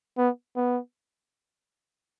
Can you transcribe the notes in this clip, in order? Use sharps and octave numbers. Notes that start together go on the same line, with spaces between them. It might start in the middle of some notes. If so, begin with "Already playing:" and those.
B3
B3